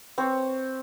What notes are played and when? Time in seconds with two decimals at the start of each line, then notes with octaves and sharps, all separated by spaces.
0.18 C4 C#5